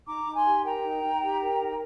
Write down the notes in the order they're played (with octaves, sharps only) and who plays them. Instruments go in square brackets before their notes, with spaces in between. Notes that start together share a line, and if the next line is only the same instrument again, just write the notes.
[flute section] D#4 A#5 D6
D#4
G#5 C6
G4
A#4 G5 A#5
D#4
D#4
G4
A#4
D#4